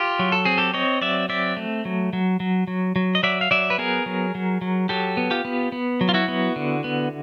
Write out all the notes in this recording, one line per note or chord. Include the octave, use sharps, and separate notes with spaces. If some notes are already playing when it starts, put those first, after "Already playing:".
Already playing: F4 G4
F#3
A4
C4 G#4
G4 A4
C4 C#5 D#5
F#3 D5 E5
C4 D5 E5
A3
F#3
F#3
F#3
F#3
F#3
D#5
F#3 D5 E5
F5
F#3 D5 E5
B4
B3 G#4 A#4
F#3
F#3
F#3
F#3 G4 A4
B3
F4 G4
B3
B3
F#3
F4
E4 F#4
B3
D3
B3